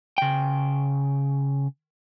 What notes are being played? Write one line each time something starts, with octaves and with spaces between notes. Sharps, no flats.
C#3 G5